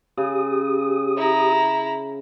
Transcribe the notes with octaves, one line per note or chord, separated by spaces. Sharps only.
C#3 G4 D#6
E4 A#5